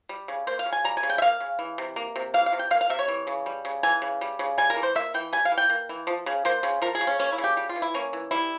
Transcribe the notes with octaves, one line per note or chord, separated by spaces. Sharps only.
G3
C#3
A#3 C5
F5
C#3
G#5
G3 A#5
G#5
C#3
G5
E5
A#3 F5
C#3
E3
C3
A#3
C3
E3 F5
F5
C3
G5
A#3 F5
F5
C3 E5
C#5
E3
C#3
G3
C#3
E3 G#5
C#3
G3
C#3
G3 G#5
A#4
E3
C5
A#3 E5
E3 G5
G3 G#5
F5
E3
G5
A#3
E3
F3
C#3
A#3 C5
C#3
F3 A#4
G#4
C#3
C#4
A#3 C#4
E4
C#3
G4
G3 G4
F4
E3
E4
A#3 C#4
E3
G3 E4